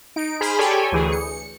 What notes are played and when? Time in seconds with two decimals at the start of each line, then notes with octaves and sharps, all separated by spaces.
0.16 D#4 D7
0.41 G#4 C5 B5 F6
0.59 G4 A4 C#5 D5 G5 G#5
0.92 D2 E3 G#4
1.12 C#7